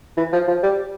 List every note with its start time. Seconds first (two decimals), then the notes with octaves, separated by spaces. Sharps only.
0.17 E3
0.33 F3
0.48 F3
0.63 G3